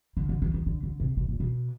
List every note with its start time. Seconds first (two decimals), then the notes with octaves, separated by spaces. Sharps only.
0.17 D3
0.29 D3
0.42 D#3
0.54 D#3
0.66 D3
0.83 D3
1.00 C3
1.17 B2
1.28 A#2
1.40 B2